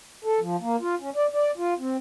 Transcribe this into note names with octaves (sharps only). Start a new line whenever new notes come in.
A4
F3
A#3
F4
C#4
D5
D5
F4
C4